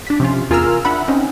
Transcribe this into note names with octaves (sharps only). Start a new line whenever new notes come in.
D4 B6
C3 F3 C#4 F4
E2 F4 G#4 A#4 E6 F6
D4 E5 F#5 B5
C4 C#4 D#4